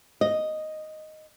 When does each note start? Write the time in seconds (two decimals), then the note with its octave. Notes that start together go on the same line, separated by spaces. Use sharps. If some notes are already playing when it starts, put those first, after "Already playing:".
0.21 D#5